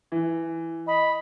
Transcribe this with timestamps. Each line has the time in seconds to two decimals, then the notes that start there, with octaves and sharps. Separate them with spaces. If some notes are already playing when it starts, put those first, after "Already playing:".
0.12 E3
0.87 D#5 B5